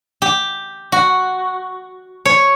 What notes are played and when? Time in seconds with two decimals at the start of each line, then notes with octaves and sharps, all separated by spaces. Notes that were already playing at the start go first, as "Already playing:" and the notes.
0.22 G4
0.92 F#4
2.25 C#5